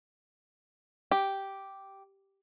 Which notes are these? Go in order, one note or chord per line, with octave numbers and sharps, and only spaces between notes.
G4